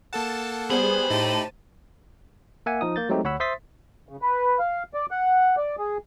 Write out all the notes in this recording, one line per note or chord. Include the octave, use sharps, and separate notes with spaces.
A#3 A4 F#5 A5
G3 B3 G#4 C5 B5
A2 D#4 G4 A5 D#7
A#3 E5 F#5 G#5
F3 D#4 D#6
A#3 G6 A6
F#3 G#3 A3 C4 D#4 G4
D2 C#5 F#5 B5 E6
C5 E5 C6 D#6 A6 B6
C#3
B4
F5
D5
F#5
D5
G#4